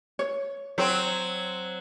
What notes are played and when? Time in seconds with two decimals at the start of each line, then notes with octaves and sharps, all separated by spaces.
0.19 C#5
0.78 F#3 C4